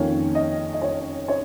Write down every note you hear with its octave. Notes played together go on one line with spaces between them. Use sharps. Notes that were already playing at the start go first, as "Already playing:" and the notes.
Already playing: F2 D#3 A#3 C#4 C#5
D#5
D#5
C#5
C#5